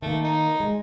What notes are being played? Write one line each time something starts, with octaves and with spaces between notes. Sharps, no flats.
D#3 A3 A#3
D#4
G#3